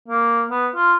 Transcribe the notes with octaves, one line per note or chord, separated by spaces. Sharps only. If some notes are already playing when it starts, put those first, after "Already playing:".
A#3
B3
F4